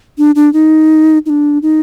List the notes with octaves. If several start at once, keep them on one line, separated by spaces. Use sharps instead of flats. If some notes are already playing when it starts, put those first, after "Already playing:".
D4
D4
D#4
D#4
D4
D#4